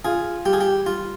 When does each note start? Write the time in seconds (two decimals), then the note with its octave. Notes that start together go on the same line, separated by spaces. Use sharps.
0.04 F4 G#4
0.45 G3 G4
0.53 G#4
0.61 G4
0.86 G3 F4